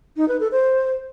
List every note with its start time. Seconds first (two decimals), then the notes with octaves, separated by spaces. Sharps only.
0.17 D#4
0.28 B4
0.40 A4
0.52 C5